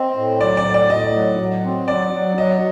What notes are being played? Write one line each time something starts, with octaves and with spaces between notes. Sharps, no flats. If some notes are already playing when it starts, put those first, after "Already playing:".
Already playing: C4 D#5
A2
F#3 D5
D5
A2
D5
A2 D#5
F#3
F#3
C4
F#3 D5
F#3
F#3 D#5